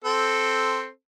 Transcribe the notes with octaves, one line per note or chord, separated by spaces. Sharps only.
C4 A4